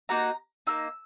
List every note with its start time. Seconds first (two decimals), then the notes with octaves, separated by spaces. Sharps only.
0.09 A#3 D#4 F#4 A#5
0.67 A#3 D#4 E6